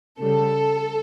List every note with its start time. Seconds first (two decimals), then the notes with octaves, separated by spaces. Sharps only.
0.20 C#3 G3 A4